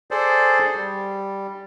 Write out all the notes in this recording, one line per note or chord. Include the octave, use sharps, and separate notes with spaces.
G#4 A4 C5 D5
G3